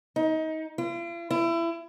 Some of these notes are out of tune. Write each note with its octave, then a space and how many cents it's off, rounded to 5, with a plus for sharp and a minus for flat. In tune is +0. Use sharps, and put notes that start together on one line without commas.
D#4 +25
F4 -45
E4 +25